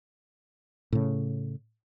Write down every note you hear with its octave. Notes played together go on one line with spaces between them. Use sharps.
A2 C#3